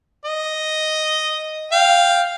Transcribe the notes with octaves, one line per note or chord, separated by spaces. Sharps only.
D#5
F5 G5